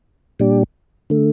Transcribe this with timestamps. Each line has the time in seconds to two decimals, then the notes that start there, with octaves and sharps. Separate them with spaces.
0.39 A#2 G3 D4 G4
1.10 D3 A3